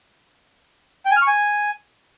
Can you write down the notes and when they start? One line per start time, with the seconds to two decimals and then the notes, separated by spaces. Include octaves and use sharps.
1.06 G5
1.11 G#5
1.16 F6
1.22 C#6
1.27 G#5